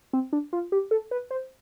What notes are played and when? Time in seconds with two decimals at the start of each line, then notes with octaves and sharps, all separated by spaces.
0.13 C4
0.33 D4
0.53 F4
0.72 G4
0.91 A4
1.11 B4
1.31 C5